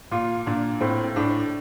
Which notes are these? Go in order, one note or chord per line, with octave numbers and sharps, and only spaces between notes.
A#2 F4
A#2 D4
A2 C4
A2 D4